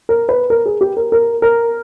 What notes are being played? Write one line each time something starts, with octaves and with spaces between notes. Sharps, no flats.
A#4
B4
A#4
G#4
G4
A#4
A#4
A#4